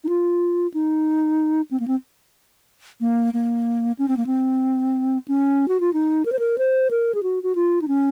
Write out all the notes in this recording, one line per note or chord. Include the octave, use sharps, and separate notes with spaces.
D#4
F4
D#4
C4
A#3
C4
A#3
A#3
C#4
C4
A#3
C4
C#4
F#4
F4
D#4
A#4
C5
A#4
C5
A#4
G#4
F#4
F#4
F4
D#4
C#4